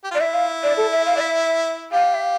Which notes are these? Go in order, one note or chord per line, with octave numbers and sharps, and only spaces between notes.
G4
F4
D5
E4 E5
F5
D5
A4
E5
F5
D5
E5
G4 F5
E5
F5